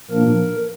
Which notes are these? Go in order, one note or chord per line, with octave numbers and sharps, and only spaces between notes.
A#2 F3 A#3 D4 A#4